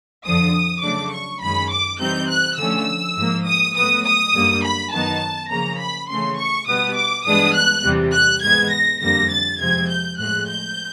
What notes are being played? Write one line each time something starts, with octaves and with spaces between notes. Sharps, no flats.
F2 D3 F3 D#6
C#3 F#3 A3 D4 D6
C#6
F#2 D#3 G#3 C#4 B5
D6
C3 E3 G3 C4 D#4 G6
F#6
D3 F3 A3 C#4 E6
G#2 F3 A#3
D#6
A2 F#3 B3 D#6
D#6
F#2 D3 G3 A#3
B5
F#2 D#3 F#3 B3 D#4 A5
C#3 F3 A#3 C#4 A#5
B5
C#3 E3 A3 C#4 C6
C#6
B2 G3 B3 D#6
D6
G2 E3 G#3 B3 D4 D#6
F#6
E2 C3 E3 G3
F#6
G#2 E3 G#3 B3 G#6
A#6
F2 D3 G3 A#3 A#6
A6
F2 C3 F3 G#3 C4 G#6
G6
A2 F3 G#3 F#6
G6